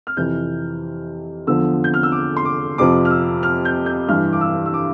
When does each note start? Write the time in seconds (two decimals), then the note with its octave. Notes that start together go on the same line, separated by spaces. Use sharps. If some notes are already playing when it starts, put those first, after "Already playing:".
0.07 F6
0.17 F2 C3 E3 G6
1.47 E2 D3 F3 E6
1.84 G6
1.94 F6
2.03 E6
2.12 D6
2.37 C6
2.45 D6
2.78 F2 C3 F3 D6
3.05 F6
3.11 E6
3.43 F6
3.65 G6
3.86 G6
4.08 G2 E3 F6
4.33 D6
4.41 E6
4.66 E6
4.74 D6